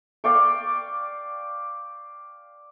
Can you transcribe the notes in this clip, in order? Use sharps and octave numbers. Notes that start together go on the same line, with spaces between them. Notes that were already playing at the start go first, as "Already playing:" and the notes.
D5 F5 G5 C#6